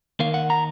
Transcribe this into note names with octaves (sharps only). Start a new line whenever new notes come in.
D#2 D#3 A#3 F5
F#5
A#5